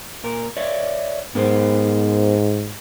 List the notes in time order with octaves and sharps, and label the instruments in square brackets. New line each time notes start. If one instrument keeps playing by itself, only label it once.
[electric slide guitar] A#2 A#4
C#5 D5 E5
[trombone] G#2 [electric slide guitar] B3 A#4 C5